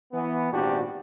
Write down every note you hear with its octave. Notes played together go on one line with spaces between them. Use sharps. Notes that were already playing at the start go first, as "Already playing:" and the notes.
E3 B3
G#1 A#2 D4 F#4 G4